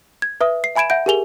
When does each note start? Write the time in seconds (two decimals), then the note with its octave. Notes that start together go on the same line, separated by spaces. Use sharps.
0.22 G#6
0.41 B4 E5 D#6
0.64 C7
0.76 E5 G#5 B5 G#6 D7 E7
0.90 E5 F#5 G6 D7
1.06 G4 G#4 A#4 G#5 F7 G7